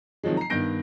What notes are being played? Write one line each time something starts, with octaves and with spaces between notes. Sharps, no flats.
C3 D#3 F3 F#3 G#3
A#5 C7
G2 D#3 B3 G6 A#6 D7